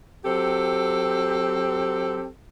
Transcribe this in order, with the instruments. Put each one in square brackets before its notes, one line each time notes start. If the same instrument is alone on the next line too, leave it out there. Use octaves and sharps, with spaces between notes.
[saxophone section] F#3 C4 G4 A4